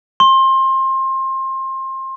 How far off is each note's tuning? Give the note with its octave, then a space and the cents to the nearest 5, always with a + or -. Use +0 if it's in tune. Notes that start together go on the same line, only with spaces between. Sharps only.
C6 +25